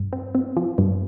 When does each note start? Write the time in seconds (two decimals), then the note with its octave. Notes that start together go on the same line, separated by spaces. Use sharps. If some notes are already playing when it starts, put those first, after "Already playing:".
Already playing: G2
0.13 C4
0.35 C4
0.57 F3
0.78 G2